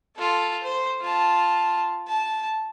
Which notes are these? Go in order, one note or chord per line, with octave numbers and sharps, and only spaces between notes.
F4 A4
C5
F4 A5
A5